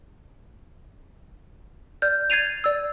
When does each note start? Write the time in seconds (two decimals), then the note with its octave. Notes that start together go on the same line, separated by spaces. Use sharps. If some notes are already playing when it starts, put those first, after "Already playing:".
2.02 D5 F6 G6
2.30 G#6 A6 C7 D#7 F7
2.64 D5 E6